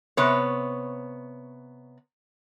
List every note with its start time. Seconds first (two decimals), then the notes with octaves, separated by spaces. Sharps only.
0.17 C3 B3 C#5